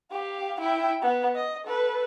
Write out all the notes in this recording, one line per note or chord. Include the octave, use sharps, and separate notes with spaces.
G4 F5
E4 G5
B3
D#5
A4 B4